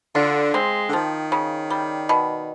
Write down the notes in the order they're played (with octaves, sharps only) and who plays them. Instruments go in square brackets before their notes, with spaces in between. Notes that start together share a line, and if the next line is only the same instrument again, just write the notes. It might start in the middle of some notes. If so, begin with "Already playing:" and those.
[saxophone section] D3 [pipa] F4
[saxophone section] G#3 [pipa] C4
[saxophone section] D3
[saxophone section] D#3 [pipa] F3
[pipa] C#3
G3
B2